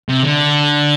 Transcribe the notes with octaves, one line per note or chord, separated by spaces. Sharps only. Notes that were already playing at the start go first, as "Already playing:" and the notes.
C3
D3